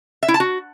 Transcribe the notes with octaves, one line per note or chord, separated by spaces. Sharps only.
E5
E4
A5
F#4